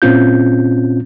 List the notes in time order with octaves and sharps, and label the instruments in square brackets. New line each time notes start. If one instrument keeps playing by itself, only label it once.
[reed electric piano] A#2 C4 C#4 F4 G6